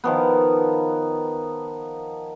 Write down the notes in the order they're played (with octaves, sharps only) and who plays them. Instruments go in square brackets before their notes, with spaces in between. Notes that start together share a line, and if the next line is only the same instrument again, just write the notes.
[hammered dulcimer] D#3 F3 B3